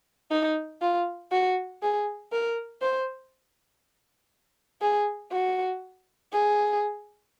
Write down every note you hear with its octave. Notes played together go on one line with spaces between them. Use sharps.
D#4
F4
F#4
G#4
A#4
C5
G#4
F#4
G#4